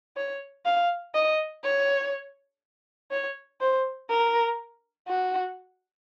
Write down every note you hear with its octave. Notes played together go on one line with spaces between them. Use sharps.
C#5
F5
D#5
C#5
C#5
C5
A#4
F#4